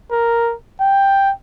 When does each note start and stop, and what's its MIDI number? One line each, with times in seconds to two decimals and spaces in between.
0.11 0.54 70
0.81 1.32 79